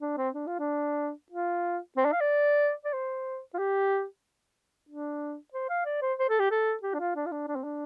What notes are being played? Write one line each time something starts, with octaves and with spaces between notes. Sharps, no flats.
D4
C4
D4
F4
D4
F4
C4
D4
F5
D5
D5
C5
F4
G4
D4
C5
F5
D5
C5
C5
A4
G4
A4
G4
D4
F4
D4
F4
D4
D4
C4
D4